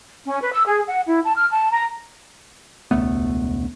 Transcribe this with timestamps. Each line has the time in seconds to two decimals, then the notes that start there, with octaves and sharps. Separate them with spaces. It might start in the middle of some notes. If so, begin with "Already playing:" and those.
0.25 C#4
0.40 B4
0.52 E6
0.66 G#4
0.88 F#5
1.06 E4
1.24 A5
1.36 F6
1.50 A5
1.71 A#5
2.91 E1 C#2 A3 B3